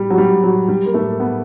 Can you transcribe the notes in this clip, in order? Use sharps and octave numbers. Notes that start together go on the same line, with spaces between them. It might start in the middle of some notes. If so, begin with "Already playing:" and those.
Already playing: G3
F#3
G3
F#3
G3
A#3
A3
B3